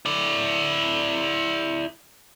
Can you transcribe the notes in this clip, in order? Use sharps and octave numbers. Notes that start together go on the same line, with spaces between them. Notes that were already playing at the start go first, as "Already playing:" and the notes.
E4 D5